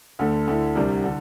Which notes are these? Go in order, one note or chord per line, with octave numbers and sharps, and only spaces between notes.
D2 D3 A3
D2 D3 A3 E4
C2 C3 G3 D4
D3